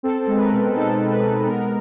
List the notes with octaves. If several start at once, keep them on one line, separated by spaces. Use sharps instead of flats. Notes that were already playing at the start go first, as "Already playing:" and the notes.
C4 A4
G#3
B4
A#4
B2
D#4 A4
C4
B4
G#3
B3 A#4